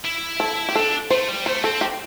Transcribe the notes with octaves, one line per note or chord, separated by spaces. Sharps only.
E4
A4
G4
D4 A4
A3 C5
G3
A3 C5
C4 A4
G4